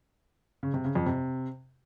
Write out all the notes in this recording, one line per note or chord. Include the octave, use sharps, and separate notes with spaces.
C#3
C3
C#3
F2
C3